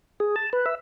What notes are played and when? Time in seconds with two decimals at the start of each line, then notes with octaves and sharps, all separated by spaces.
0.20 G#4
0.36 A5
0.53 B4
0.66 E5